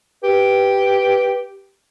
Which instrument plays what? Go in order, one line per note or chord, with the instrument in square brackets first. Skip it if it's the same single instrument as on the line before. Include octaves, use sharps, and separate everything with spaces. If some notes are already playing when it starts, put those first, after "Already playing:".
[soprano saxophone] G4 [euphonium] B4